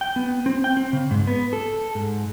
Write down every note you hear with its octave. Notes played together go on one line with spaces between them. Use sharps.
G5
B3
C4
G5
C4
C#3
G#2
B3
A4
G#2